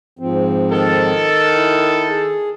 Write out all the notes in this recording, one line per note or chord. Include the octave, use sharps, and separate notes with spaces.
G#2 F3 C4
D#3 A4
E4
G#4